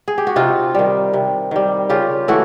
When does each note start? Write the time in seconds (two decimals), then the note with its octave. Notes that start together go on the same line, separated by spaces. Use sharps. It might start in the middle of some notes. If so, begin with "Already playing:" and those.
0.08 G#4
0.18 G4
0.27 F#4
0.36 C3 D#4 F4
0.75 D#3 G3
1.13 C3
1.51 D#3 G3
1.90 C#3 F4 G4
2.28 E3 A3 E4 F#4